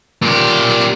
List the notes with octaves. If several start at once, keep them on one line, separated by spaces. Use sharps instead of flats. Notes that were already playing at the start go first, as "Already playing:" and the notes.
A#2 G4